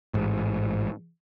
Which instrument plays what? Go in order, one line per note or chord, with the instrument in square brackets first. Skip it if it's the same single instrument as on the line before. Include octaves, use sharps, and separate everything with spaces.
[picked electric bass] A1 G#2